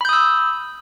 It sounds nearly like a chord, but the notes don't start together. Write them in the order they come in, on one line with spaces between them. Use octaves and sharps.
B5 G6 D#6 E6